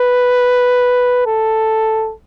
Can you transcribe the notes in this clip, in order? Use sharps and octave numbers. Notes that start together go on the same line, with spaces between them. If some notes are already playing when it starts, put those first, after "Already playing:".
Already playing: B4
A4